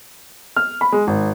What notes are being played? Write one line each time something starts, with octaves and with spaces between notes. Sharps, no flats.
F6
B5
G#3
G#1